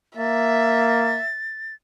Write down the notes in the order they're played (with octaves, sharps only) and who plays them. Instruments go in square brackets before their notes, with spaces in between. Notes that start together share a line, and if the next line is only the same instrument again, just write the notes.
[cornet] A#3 [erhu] E5 [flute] A6